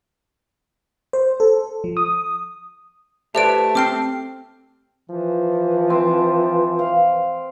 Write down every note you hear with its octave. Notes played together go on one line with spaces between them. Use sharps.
C5
A4
F3
D#6
A3 G4 B4 C5 D5 E5 D7
C4 G5 D6 F6 C7
E3 F3
C4
F5